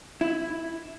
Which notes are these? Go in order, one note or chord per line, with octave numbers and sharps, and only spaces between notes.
E4